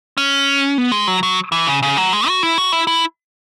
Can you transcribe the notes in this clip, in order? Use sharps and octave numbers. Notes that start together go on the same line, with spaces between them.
C#4
B3
G#3
F#3
F#3
E3
C#3
C#3
F#3
G#3
F#4
E4
F#4
E4
E4